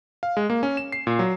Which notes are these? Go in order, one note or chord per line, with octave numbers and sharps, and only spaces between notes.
F5
G#3
A#3
C#4
E7
C7
A#2
F#3